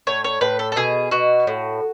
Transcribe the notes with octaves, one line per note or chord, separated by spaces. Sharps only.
A2 C#5
C#5
A2 B4
A4
A4
B2 G#4
B2 F#4
A2